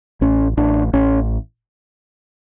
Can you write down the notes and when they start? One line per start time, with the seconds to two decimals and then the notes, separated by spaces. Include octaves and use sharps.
0.21 A1 C#4
0.57 A1 D4
0.93 A1 C#4